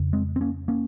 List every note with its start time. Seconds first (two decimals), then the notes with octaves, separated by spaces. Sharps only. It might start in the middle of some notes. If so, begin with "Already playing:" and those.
Already playing: F2 C#3
0.13 G#3 C4
0.36 C4
0.41 A#3 C#4
0.68 A#3 C#4